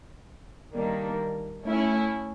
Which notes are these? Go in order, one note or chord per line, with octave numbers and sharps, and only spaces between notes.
D#3 G3 A#3 D4
A3 C#4 E4